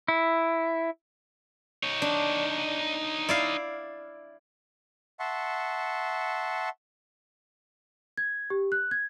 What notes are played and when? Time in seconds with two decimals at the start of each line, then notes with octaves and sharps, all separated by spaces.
0.08 E4
1.83 D#4 C#5
2.02 D4
3.29 E4 D5 F5
5.20 E5 F#5 A5 C6 C#6
8.17 G#6
8.50 G4
8.72 F#6
8.91 G#6